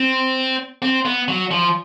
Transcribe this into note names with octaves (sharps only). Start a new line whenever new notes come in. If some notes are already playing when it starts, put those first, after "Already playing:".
Already playing: C4
C4
B3
F#3
F3